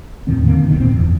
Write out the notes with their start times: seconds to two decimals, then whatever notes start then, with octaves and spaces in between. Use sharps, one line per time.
0.27 E2 A2 D#3 C4
0.46 D3 D#3 A#3 C4
0.68 B1 E2 B2 D#3
0.80 D#1 A#2 C4
0.92 F#1 E2